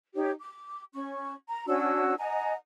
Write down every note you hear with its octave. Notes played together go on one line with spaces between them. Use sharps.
D#4 G4 C#5
D6
C#4 C#6
A#5
C#4 D4 F#4 E6
D#5 F#5 G#5 A#5